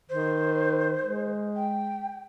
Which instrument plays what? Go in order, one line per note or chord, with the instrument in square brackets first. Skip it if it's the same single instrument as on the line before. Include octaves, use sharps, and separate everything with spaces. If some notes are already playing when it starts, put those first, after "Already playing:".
[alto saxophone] D#3 [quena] C5
[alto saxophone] G#3
[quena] G5